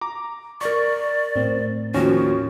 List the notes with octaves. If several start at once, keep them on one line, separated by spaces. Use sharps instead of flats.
A#5 D6
A#4 D5 C#6
A2 C4
D#2 F3 C#4 F#4